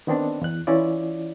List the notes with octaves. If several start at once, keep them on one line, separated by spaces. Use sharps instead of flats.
D#3 B3 C4 D4
E2 F#6
E3 C#4 E4 F4 D5